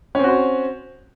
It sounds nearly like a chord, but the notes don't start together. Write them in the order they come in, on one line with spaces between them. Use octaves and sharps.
C#4 C4 F#4 C5